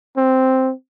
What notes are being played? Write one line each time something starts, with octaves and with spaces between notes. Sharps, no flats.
C4